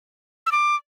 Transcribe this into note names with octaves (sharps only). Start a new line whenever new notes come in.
E6
D6